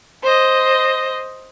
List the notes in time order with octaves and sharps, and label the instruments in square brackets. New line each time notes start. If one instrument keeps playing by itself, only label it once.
[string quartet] C5 D#5